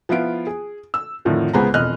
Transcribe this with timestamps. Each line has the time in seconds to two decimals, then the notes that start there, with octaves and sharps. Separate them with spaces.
0.09 F3 B3 E4 F4 D7
0.47 G#4
0.94 E6
1.25 F2 A2 D3 D#3 F3
1.53 C#2 G#3 B3 C5 A#5
1.74 E1 F2 D#5 F6 F#6